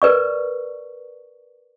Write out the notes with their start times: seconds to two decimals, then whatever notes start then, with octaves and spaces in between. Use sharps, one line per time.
0.02 A#4 B4 D5 C#6